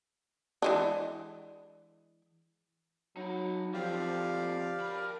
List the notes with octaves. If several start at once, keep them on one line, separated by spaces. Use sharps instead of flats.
E3 G#3 D4
F#3 D#4 B5
D3 F3 C4 G4 D5 F5
A#4 B5